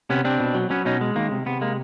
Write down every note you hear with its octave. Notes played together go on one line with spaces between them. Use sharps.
C3 B3 C#4
C3 C4 D4
B2
F#3
F#3 B3 C#4
B2 C#4 D#4
G#3
D#3 A#3
C3
C3 B3
G#3 A#3